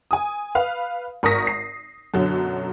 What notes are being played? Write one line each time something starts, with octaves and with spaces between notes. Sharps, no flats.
G#5 D#6
B4 F5
G#1 A#4 C#6 D#6 A#6 B6
C7
F#2 B2 D3 F#3